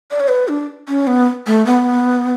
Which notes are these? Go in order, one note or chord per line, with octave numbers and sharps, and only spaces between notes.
D5
C#5
B4
D4
C#4
B3
A3
B3